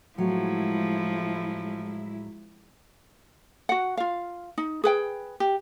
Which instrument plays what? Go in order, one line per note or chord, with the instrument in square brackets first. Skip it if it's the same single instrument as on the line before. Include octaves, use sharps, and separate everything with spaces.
[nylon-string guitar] A2 F#3 [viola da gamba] F3 [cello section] G#3 E4
[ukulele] F#4 F#5
F4 F5
D#4
G#4 B4 G5
G4